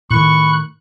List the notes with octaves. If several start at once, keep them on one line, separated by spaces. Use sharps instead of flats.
A2 D#3 B5 C#6 F#6